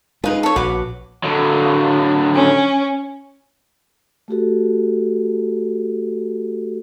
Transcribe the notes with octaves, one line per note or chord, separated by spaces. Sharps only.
G#3 D#4 F4 G#4 B4
A4 C#5
A#1 F#4 B4 C#5 D6
D3 F#3
C#4
A3 F#4 G4 A4